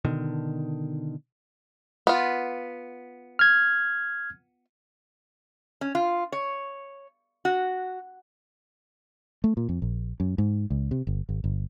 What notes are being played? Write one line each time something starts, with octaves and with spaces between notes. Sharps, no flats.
B2 D3 D#3
B3 F4
F6 G#6
C#4
F4
C#5
F#4
A3
A#2
F2
A#1
F#2
G#2
C#2
C3
G1
G#1
G1